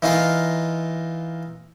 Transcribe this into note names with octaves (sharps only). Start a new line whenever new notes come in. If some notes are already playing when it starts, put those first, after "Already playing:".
E3 D#4 F4 A#4 F5